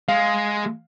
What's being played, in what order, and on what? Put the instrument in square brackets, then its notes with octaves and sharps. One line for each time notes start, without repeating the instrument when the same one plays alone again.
[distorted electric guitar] G#3 [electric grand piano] F5